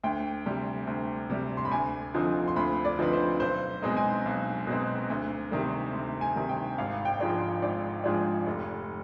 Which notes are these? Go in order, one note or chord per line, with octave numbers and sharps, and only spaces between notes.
D2 G5
C3 G3
D2
C3 G3
C6
B5
D2 G#5
D3 F3 C4 D#4
C6
D2 B5
D5
D3 F3 C4 D#4 B4
C5
B1 C5
B2 G#3 C4 D#4
G#5
B1
B2 G#3 C4 D#4
D2
C3 D#3 G3
D2
G#5
C3 D#3 G3
G5
G#1 F5
G5
G#2 F3 G#3 D4
G#1 D5
G#2 F3 G#3 D4
F1